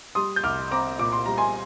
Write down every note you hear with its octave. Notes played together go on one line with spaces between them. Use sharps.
G3 C6 D#6
G6
C2 D6 F6
C4 A#5 D6
A#2 D6
C6
G3 A#5
G#5 C6